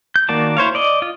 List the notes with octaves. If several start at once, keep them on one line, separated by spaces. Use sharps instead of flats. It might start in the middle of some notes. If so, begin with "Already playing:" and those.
G6
D#3 A#3 F#4 D5 A5
E4 C5 C#5 F5
D5 D#5
F4 D#5